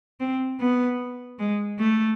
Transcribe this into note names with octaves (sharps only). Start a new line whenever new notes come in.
C4
B3
G#3
A3